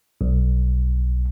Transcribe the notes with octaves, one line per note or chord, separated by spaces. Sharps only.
B1